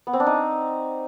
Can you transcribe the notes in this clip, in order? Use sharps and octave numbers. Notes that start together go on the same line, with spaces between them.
B3
C4
D4
D#4